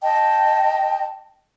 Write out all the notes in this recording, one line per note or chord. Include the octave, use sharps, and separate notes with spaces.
D#5 G5 A5